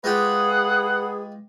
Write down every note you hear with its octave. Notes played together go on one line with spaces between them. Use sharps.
G#3 F4 G4 G#4 B4 F#5